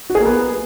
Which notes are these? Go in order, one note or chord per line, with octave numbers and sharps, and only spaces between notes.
F#4
G#4
A#3
B3